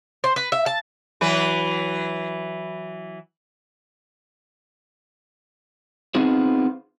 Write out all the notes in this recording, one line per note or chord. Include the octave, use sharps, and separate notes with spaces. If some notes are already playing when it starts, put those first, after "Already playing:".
C5
B4
E5
A5
E3 F#3 B4
B3 C4 D#4 F4 G#4 C5